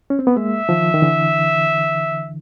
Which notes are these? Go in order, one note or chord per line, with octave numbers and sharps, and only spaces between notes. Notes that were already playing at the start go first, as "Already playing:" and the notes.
C#4
C4
B3
G#3 A#3 E5
D#3 F3
D#3
D3 E3